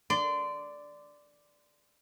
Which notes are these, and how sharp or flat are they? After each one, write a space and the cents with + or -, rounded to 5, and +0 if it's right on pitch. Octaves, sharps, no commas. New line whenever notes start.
D5 +0 C6 -25